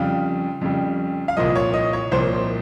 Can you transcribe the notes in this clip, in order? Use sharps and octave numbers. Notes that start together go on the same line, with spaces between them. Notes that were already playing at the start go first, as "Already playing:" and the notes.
Already playing: F2 C#3 G3 F5
F2 C#3 G3
F5
C2 A#2 F3 D#5
C#5
D#5
C#5
C2 A#2 F3 C5